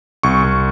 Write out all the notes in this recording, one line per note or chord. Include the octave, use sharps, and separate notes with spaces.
C2 C#6
C2